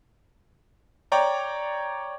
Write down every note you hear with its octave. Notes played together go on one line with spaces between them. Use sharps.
C#5 D5 G5 A#5